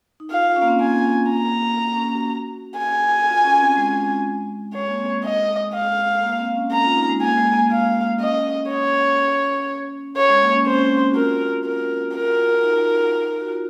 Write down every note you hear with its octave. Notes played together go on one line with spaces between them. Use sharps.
D#4
F4 F5
F4
C#4
A#3
C4
A#3 G#5
A#5
A#3
C#4
F#4
G#5
F4
C#4
C4
G#3
G#3 C#5
A#3
C4
G#3
G#3 D#5
F5
A#3
C4
C#4
A#5
F4
D#4
G#3
A#3 G#5
G#3
A#3
G#3
A#3 F5
C#4 D#5
C#5
C#5
G#3
A#3
C#4
C4 C5
C#4
F#4
F4 A#4
A#4
F4 A#4
F#4
F4
F4
D#4
F#4
F4